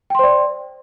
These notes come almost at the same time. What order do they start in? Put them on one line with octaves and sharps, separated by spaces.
G5 C6 C5 D5